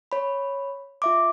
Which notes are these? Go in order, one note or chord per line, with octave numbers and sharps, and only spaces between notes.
C#5 B5
F4 E5 D6